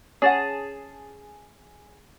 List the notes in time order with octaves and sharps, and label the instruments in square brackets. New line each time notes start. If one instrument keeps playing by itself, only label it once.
[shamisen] C#4 F#5 [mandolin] G#4 A5